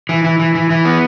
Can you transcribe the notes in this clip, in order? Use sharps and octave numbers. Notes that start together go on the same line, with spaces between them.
E3
E3
E3
E3
E3
B3